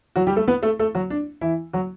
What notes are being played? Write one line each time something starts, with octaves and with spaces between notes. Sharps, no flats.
F#3 F#4
G3 G4
A3 A4
B3 B4
A3 A4
A3 A4
F#3 F#4
D4
E3 E4
F#3 F#4